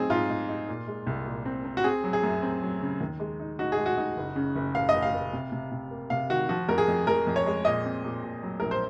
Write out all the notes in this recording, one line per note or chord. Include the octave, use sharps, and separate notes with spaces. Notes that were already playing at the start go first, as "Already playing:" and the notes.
Already playing: F#3 C4 D#4 G#4
G#2 F4
G#2
D#4
A#2
G#3
C2
A#2
C4
C4
F#4
C4 G#4
F#3
G#4
F#2
C4
F#3
C#3
D#2
G#3
D#4
D#4 F#4
G#4
G#3
F#4
D#4
F#1
C#3
F#1
F#1 F5
D#5
F#1
F5
F#1
C3
C3
C3
A#3
C3 F5
D#3 F#4
F3 F#4
F2 A#4
G#4
F2
F2 A#4
F2
C#5
G#3
A#2 D#5
C4
A#2
A#2
F#3
A#1 A#4
C5